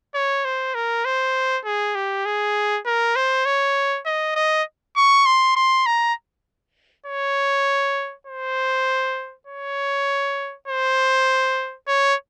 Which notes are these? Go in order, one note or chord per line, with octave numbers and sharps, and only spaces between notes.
C#5
C5
A#4
C5
G#4
G4
G#4
A#4
C5
C#5
D#5
D#5
C#6
C6
C6
A#5
C#5
C5
C#5
C5
C#5